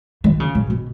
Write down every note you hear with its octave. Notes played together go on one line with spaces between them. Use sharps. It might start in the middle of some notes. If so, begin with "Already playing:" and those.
D#3
C#3
B2
B2